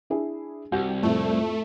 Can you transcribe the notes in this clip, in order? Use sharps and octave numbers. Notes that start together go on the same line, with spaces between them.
D4 E4 G#4
C2 F#4 G4 G6
F2 A2 A3 E4